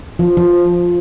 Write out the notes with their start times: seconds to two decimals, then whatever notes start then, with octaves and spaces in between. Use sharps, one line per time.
0.19 F3
0.37 F3